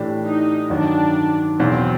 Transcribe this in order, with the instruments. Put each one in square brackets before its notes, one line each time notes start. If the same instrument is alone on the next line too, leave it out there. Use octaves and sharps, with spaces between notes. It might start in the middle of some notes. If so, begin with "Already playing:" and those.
Already playing: [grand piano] A2 E3 A3 D4 G4
[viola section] D#4
[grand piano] G2 D#3 F#3 [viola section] D4
[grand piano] E1 E2 B2 F#3 [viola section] C4